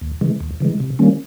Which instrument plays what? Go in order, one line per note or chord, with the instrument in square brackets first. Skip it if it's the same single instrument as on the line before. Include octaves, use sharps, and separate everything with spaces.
[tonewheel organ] D#2
C#3 E3 G#3
D#2
C#3 E3 G#3
C3
D#3 G3 A#3 C#4